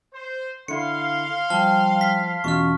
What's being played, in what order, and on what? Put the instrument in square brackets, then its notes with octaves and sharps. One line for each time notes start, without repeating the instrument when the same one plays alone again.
[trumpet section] C5
[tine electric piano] D3 E4 [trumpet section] F5 C6 [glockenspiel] C#7
[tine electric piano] F3 [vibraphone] G3 G5 [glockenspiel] A5 F6 G7
[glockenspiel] B6
[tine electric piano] E2 B2 F4 [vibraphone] C#4 [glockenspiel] C#6 F6